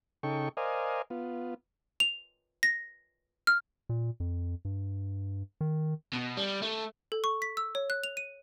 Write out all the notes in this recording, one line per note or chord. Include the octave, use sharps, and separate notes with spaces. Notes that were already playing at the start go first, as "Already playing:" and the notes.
C#3 D#4 A4 G5 C#6
A#4 C5 D5 D#5 F5 G#5
B3 F4
F7
A#6
F6
A#2
F2
G2
D#3
B2
G3
A3
A4
C#6
B6
E6
C#5
F#6
F7
D#7